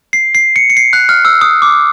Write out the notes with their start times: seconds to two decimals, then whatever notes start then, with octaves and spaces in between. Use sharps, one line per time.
0.13 C7
0.35 C7
0.56 C#7
0.70 C#7
0.77 C7
0.93 F#6
1.09 F6
1.25 E6
1.41 D#6
1.62 D6